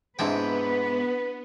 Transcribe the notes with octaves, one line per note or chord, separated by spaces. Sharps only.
G#2 C3 B3 C4 D4 E4 B4 G5